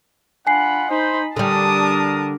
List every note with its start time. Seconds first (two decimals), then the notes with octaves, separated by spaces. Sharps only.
0.47 D4 F4 F#5 G#5 B5 C7
0.89 D#4 C5 B5
1.36 D3 G3 D4 A#4 A5 D#6